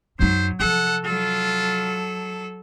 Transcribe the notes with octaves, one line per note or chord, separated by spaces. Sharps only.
F#2 F#3 D#4 C5
C3 F3 A4 F#5
F#3 F4 A4